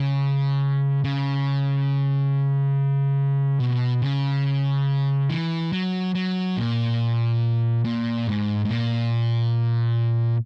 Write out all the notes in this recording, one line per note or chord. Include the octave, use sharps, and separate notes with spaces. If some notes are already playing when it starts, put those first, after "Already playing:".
Already playing: C#3
C#3
B2
C#3
E3
F#3
F#3
A#2
A#2
G#2
G#2
A#2